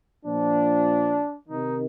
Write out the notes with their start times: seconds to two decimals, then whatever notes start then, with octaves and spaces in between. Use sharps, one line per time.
0.24 A#2 F3 D4
1.48 C3 D#3 D#4